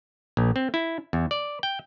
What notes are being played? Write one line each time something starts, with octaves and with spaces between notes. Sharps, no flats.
A#1
C4
E4
E2
D5
G5